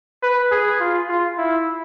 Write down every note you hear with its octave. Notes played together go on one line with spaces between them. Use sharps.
B4
G#4
F4
F4
E4